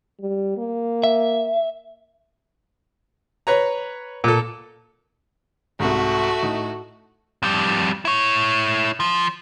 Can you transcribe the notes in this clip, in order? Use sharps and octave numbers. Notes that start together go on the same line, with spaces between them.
G3
A#3
E5
B4 C#5 A#5
A#2 A4
C2 G#2 A3 F#4
A2 D#4
F2 G3
E4 C#5
F3